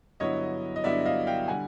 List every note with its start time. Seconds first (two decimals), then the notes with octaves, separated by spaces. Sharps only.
0.20 G2 D3 F#3 B3 E4 C#5 D#5
0.76 D#5
0.84 G2 D3 F#3 B3 E4 D5 E5
1.06 D#5 F5
1.27 F5 G5
1.48 D3 G3 F#5 G#5